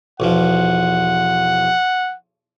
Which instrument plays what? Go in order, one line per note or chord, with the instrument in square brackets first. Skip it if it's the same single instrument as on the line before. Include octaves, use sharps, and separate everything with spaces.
[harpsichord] B1 E2 F3 [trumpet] F#5